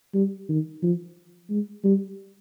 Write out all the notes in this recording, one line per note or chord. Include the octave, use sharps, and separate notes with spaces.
G3
D#3
F3
G#3
G3